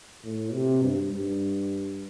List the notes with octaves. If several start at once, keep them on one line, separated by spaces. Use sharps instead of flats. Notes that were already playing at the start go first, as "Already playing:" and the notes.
A2
C3
G2
G2